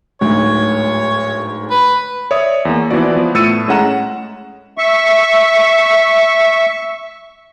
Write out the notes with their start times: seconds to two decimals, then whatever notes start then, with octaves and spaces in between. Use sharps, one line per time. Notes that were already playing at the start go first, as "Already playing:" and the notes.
0.21 D1 D2 G#2 C#5
1.70 B4
2.31 C#5 D5 E5 D#6
2.65 E2 A#3
2.91 E3 F3 B3 E4 F#4 D5
3.15 F3 B3
3.34 A2 A3 E6 A6 C#7 D#7
3.68 A2 G#3 C#4 F#5 A#5 E7
4.78 E5 C#6